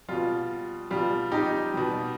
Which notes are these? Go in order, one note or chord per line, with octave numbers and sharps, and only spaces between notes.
B2 G3 F4
B2 G3 F4
D#4 G4
B2 G3